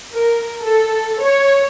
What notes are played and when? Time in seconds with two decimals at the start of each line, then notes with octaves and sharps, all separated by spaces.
0.13 A#4
0.62 A4
1.22 C#5